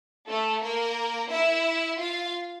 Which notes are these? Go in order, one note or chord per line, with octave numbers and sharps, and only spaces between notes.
A3 A4
A#3 A#4
E4 E5
F4 F5